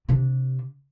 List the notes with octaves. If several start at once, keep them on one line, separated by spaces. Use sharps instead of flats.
C3 D4